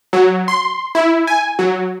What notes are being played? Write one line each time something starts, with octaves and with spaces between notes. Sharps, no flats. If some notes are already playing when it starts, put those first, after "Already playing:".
F#3
C6
E4
G#5
F#3